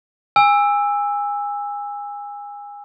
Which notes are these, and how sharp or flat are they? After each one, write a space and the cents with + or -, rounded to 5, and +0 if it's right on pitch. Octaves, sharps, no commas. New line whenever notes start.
G#5 -25 E6 +0